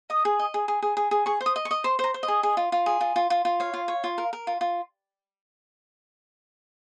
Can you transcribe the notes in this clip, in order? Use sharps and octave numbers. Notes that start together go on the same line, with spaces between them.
D#5 D#6
G#4
D#5
G#4
G#4
G#4
G#4
G#4
G#4 C#6
C5
D#6
D#5
C#6
D#5
C5 C6
C5 A#5
C5
D#5
G#4
G#4
F4
F4
G#4
F4
F4
F4
F4
C#5 F5
F4
C#5
F4
A#4
A#4
F4
F4